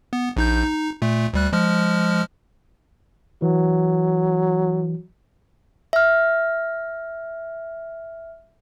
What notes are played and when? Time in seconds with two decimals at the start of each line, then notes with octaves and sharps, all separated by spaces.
0.13 B3
0.37 A#1 D#4 G6
0.63 D#4
1.02 A#2 A3
1.34 D2 G3 F#6
1.53 F3 G#3 F6
3.42 E3 F#3
5.93 E5 F6